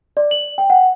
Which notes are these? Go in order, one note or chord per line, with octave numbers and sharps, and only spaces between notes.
D5
F#7
G5
F#5